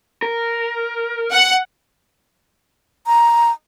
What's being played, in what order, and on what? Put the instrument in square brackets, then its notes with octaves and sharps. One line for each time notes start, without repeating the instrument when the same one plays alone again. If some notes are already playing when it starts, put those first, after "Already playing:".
[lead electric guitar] A#4
[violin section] F#5
[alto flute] A#5